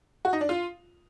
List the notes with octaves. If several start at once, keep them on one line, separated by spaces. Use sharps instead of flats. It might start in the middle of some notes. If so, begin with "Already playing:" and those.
F#4
D#4
D4
F4